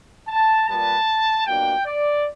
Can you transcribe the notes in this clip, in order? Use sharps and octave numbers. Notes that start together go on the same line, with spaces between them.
A5
A#2 G3 B3 A5
B2 F#3 A#3 D4 F4 G5
D5